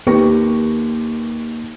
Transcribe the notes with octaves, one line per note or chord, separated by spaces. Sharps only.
D#2 A#3 G4 B4 C#6 A#6